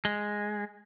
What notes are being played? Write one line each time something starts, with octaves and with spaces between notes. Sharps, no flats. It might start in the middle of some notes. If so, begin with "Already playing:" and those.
G#3